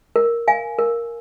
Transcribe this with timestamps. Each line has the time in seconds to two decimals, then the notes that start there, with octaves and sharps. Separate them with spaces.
0.16 A#4
0.48 F5 G#5
0.79 A#4